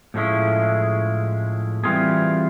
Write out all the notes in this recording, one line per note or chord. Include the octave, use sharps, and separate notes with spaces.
A2 F3 G#3 C#4 E4
E3 G3 C4 F4 G#4